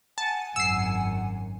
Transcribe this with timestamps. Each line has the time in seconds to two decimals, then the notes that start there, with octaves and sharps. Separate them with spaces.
0.18 F#5 G#5 A5
0.56 G#1 F#2 E6 C7